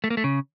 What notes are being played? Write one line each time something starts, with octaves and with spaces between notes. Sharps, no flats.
A3
A#3
A3
C#3